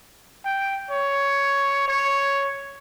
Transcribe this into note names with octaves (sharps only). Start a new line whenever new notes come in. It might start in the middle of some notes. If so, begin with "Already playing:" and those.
G5
C#5
C#5